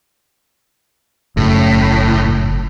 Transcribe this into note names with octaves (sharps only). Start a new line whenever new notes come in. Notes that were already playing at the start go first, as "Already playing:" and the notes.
F#1 A2